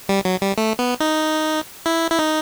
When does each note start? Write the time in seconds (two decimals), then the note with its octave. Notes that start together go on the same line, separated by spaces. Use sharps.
0.09 G3
0.25 F#3
0.42 G3
0.58 A3
0.79 B3
1.00 D#4
1.86 E4
2.11 E4
2.19 D#4